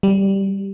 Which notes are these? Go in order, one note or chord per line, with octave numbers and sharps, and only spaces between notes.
G3